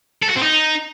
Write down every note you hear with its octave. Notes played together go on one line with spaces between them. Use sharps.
A4
F#4
C4
D#4